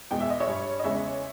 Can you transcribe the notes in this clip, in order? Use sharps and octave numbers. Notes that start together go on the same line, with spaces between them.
E2 B2 G#3 G5
E5
D#5
C#5 E5
G2 G3
D#5
E2 C#3 G#3 C#5 E5